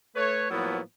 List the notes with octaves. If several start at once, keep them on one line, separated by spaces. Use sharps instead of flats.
A3 B4 C#5
A2 F3 F#3 A#3 B3